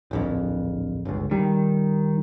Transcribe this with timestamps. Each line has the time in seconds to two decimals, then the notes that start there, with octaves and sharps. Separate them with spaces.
0.11 D1 A#1 F2
1.05 G1 C#2
1.31 D#1 D#3 G3